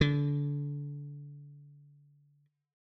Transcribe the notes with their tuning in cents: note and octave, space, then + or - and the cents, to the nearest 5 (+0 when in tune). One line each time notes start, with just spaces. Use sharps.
D3 -25